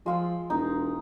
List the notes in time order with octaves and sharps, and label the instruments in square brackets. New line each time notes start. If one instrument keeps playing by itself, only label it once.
[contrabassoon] F3 [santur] G#3 F4 E6
[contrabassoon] E1 [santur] D#4